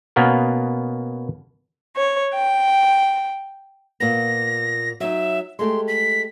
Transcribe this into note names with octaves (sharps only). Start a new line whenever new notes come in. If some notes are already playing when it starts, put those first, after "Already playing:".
B2 A#3 B3 C#4 A#4
C#5
G5
A#2 B3 A#6
F#3 D#4 E5
G#3 A3 G4 C6
B6